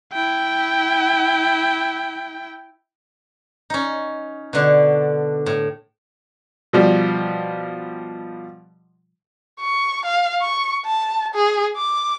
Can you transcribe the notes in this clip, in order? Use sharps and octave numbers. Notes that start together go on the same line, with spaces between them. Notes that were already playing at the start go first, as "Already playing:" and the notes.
E4 G5
C#4 D#4
B2 D3 D4
A2
B2 F3 G3
C#6
F5
C#6
A5
G#4
D6